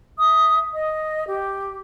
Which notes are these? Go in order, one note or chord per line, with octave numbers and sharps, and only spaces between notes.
E5 D#6
D#5
G4